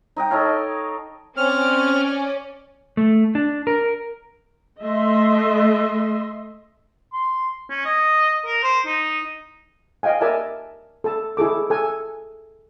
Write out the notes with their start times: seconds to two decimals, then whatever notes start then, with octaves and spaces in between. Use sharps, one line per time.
0.16 D#4 D#5 G5
0.31 D#4 A4 C#5 F5
1.37 C4 C#4 D5 F6
2.97 A3
3.35 D4
3.67 A#4
4.83 A3 D#5 E5 C6
7.13 C6
7.70 C#4
7.85 D#5
8.46 A#4
8.63 C5
8.86 D#4
10.03 D#5 F5 G5 G#5
10.21 A#4 D5 E5 G#5 A5
11.04 A4 A5
11.37 E4 G#4 A4 D6
11.70 A4 G#5